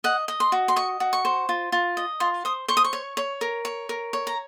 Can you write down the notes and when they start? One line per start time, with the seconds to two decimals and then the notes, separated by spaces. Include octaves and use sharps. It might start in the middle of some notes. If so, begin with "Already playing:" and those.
0.04 D#5 F#5
0.28 D#5
0.40 C6
0.52 F#4
0.68 C6
0.76 D#5 C#6
1.00 F#4
1.13 C#6
1.25 C5
1.49 F4
1.72 F4
1.97 D#5
2.20 F4 C6
2.45 C5 D#6
2.68 C5 C#6
2.77 D#6
2.85 C#6
2.93 C#5
3.17 C#5
3.41 A#4
3.65 C#5
3.89 A#4
4.13 C#5
4.27 A#5